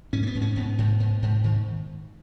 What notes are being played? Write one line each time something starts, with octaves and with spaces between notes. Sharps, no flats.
G#2 C#4
A#3
B3
G#2
C#4
G#2 B3
G#2
G#2
G#2
G#2 D#3